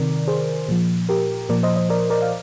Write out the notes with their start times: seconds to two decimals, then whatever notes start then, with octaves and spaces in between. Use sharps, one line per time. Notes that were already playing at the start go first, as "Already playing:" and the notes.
Already playing: C3 D#3 A#4 D5
0.28 G#4 C5
0.69 A#2 F3
1.09 G4 A#4
1.49 A#2 F3 A#4 D5
1.63 C5 D#5
1.76 C5 D#5
1.90 A#4 D5
2.10 A#4 D5
2.22 F5